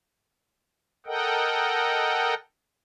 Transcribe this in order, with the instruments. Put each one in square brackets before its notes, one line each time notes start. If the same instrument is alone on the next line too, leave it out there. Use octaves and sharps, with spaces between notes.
[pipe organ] A4 A#4 D#5 F#5 G5